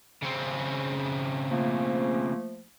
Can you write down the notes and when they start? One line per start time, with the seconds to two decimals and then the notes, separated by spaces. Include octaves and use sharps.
0.22 C#3 C4
1.50 F3 A3 A#3